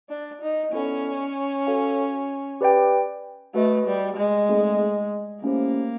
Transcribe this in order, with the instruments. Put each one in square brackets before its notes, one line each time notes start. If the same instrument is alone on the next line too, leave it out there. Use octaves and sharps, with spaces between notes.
[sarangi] D4
D#4
[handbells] B3 E4 A4 D5 F#5 [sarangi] C#4
[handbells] F#4 A4 C#5 F5 G#5
G4 B4 D5 G5
[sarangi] A3 [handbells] F#4 B4 D#5
[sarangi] G3
G#3
[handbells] A3 C4 D#4 G#4
[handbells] A3 C#4 E4 G4 C5 [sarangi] A#3